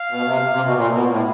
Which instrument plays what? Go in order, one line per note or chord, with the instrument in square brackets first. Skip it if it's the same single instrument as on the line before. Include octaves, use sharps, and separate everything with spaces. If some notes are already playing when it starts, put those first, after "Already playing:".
Already playing: [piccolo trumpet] F5
[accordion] B2
C3
C3
B2
A#2
B2
A2